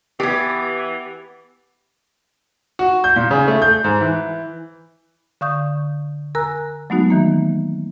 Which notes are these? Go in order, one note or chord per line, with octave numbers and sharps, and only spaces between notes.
E3 B3 G4 D5 G#5
F#4
G6
A#2
C#3
A3
G6
G#2
E3
D3 F5 C#6 D#6 G6
A#4 G#5 A#5 E6 F#6
F#3 G#3 A3 B3 D#4 F#4
D#3 E3 A#3